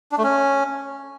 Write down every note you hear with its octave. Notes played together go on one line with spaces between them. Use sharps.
D4
A3
C#4